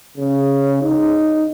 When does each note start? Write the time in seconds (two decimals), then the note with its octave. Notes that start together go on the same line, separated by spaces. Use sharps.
0.17 C#3
0.82 D#4